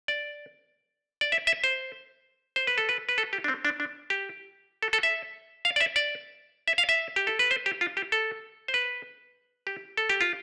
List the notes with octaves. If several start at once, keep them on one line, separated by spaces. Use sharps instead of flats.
D5
D5
E5
E5
C5
C5
B4
A4
B4
B4
A4
G4
D4
C4
D4
D4
G4
A4
A4
E5
F5
D5
E5
D5
E5
F5
E5
G4
A4
B4
C5
G4
F4
G4
A4
C5
B4
G4
A4
G4
F4